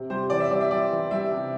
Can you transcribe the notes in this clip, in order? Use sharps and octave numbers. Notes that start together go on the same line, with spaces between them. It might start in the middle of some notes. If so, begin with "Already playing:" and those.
Already playing: C3
G3 C5
E3 D5
E5
G3 D5
E5
G3 D5
E3
G3 E5
C3